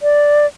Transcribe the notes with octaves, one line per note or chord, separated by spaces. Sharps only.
D5